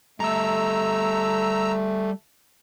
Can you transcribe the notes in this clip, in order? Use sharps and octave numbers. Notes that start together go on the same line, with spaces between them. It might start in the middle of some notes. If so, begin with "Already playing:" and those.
G3 A3 A4 A#5 E6